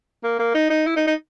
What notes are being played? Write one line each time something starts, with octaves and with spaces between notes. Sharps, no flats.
A#3
A#3
D#4
D#4
E4
D#4
D#4